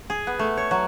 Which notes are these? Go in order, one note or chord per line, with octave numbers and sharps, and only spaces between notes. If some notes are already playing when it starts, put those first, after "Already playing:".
G#4
B3
A3
C#5
F#3